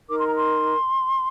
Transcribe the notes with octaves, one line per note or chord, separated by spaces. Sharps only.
D#4 A#4 D6
C6
A#5
C6